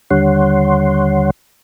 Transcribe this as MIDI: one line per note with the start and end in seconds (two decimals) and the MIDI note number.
0.10 1.30 39
0.10 1.30 50
0.10 1.30 55
0.10 1.30 73
0.10 1.30 78
0.10 1.30 84